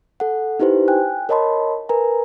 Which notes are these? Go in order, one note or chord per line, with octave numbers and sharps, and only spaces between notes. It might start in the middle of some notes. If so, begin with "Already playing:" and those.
A4 F#5
D#4 E4 G4 B4 C5
G5 G#5 F#6
A#4 C#5 D#5 A5 B5 C6
A#4 B4 G#5 A#5